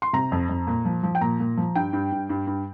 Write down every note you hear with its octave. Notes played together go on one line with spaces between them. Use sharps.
C6
C3 A#5
F2
F2
A#2
F3
F3
G5
A#2 A#5
A#2
F3
G2 G5
G2
G2
G2
G2